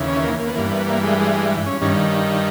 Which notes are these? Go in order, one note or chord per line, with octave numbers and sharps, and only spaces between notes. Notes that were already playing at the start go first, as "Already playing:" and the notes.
Already playing: D#2 C#3 E3
C#4
A#3
A#3
B3
G2 E3 A#3
B3
A#3
G#3
G#3
G#3
C#4
G2 D#3 C#4